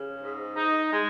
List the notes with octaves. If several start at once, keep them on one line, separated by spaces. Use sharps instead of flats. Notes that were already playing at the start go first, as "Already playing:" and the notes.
Already playing: C#3
G#2
D#4
G#3